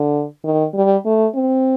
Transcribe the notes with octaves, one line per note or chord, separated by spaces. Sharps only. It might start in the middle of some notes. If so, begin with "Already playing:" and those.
Already playing: D3
D#3
G3
A3
C4